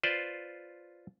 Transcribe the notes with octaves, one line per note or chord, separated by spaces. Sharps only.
F4 B4 C5 D5